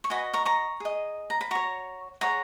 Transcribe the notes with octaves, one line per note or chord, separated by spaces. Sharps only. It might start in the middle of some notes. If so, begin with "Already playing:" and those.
C#6
F#4 B4 D#5 G#5 B5
A#5 C#6
A#5 C#6
G#4 D#5
A#5
B5
F#4 C#5 A#5 C#6
G#4 C#5 F#5 A#5